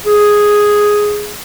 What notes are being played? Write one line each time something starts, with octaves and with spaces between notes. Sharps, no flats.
G#4